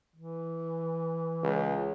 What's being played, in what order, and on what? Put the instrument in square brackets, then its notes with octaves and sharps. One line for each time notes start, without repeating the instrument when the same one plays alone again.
[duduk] E3
[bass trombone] C#2